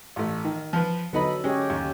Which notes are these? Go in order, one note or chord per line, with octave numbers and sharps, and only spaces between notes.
A1 A3
D#3
F3 B4
D3 F#3 B3 D#4 A4 B5
G#3 C#4 G4 C#5
D#2